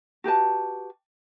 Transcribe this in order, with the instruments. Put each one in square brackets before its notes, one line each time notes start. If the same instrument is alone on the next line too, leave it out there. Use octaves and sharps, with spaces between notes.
[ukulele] F#4 G4 B4 A5